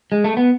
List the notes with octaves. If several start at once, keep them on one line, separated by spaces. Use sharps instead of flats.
G#3
A3
B3